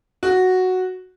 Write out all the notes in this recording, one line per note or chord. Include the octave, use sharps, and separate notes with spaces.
F#4